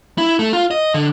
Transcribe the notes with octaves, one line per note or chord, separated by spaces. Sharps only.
E4
A3
F4
D#5
D3